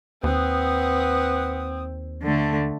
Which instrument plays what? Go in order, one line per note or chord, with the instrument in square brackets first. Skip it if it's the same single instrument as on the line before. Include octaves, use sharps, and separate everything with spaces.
[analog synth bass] D#2 [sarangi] C4 [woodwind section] B4 F#5 D#6
[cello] D3 A3